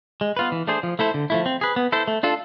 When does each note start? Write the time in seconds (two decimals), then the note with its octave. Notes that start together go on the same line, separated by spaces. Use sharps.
0.21 G#3
0.37 B3 F4 B4
0.52 E3
0.67 A3 D4 G#4 C5
0.83 F3
0.99 A3 E4 A4 C5
1.14 D3
1.30 F3 A3 E4
1.46 C4
1.61 G#4 B4
1.76 B3
1.92 E4 A4 C5
2.08 A3
2.23 D4 F4 A4